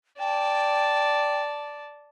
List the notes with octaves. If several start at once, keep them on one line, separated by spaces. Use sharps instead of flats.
D5 G5 A5